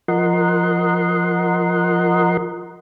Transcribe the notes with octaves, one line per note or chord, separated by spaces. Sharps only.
F3 A#4 D#5 F#5 C6